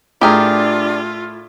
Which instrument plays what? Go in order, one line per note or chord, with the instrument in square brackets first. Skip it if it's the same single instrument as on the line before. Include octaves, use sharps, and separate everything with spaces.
[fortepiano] A2 [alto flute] D4 [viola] F4 [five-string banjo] G4 G#4 A#4